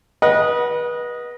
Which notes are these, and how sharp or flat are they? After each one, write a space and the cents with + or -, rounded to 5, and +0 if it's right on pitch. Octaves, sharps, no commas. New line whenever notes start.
B4 -30 D#5 +0 F#5 +0